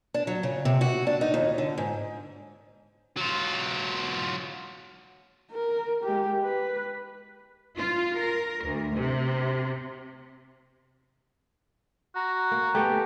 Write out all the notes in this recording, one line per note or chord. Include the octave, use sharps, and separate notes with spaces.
D4
F#3
C#3
C3
F#4
D4
D#4
D#2
D3
G#2
F#3 F4
A#4
G#3 G4
B4
F4
A#4
D2
C3
F#4 A#5
A#3
A3 B3 C#4 G4